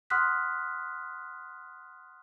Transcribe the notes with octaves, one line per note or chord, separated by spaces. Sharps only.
F#5 C6 D#6 F6 F#6 B6